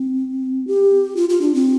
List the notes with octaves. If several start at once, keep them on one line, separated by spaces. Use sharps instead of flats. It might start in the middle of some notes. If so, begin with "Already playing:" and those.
Already playing: C4
G4
F4
F4
D4
C4